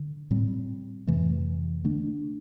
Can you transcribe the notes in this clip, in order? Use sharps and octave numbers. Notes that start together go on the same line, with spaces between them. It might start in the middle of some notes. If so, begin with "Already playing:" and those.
Already playing: D3
A2 G3 C4
F2 C3 E3 A3
D3 A3 D4